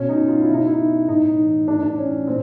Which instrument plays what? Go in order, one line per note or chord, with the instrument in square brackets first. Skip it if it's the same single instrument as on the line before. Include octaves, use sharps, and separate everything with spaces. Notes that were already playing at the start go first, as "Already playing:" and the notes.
Already playing: [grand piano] B2 C#4
D#4
F4
E4
B2 D#4
E4
A2 D#4
E3
A2 D4
D4
E3 C#4
A#2 C4